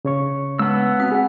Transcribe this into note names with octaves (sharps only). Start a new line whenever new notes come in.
C#3 C#5 C#6
G#3 B3 A5 E6
C4 D#6 B6
G#4 F#5